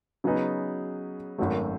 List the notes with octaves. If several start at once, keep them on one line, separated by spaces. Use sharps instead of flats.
C#3 F#3 B3 D#4 G#4
G#1 F#2 D#3 F#3 A3